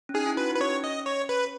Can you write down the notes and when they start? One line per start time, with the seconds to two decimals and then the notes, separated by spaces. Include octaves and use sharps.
0.09 C#4
0.14 D#4 G#4
0.26 E4
0.37 F#4 B4
0.49 D#4
0.55 B4
0.60 C#4 C#5
0.84 D#5
1.06 C#5
1.29 B4